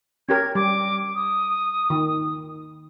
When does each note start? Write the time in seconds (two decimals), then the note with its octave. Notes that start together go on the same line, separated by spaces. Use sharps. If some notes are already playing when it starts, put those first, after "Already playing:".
0.29 C#4 G4 A#4 G#6
0.55 G3 D6
1.15 D#6
1.90 D#3